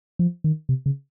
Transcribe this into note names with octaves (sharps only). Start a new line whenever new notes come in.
F3
D#3
C3
C#3